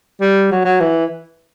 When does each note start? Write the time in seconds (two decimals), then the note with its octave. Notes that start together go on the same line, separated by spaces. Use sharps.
0.21 G3
0.51 F#3
0.65 F#3
0.80 E3